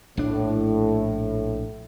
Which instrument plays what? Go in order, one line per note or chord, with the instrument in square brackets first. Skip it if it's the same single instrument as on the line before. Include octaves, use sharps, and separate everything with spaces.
[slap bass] A#1 D4 [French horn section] A2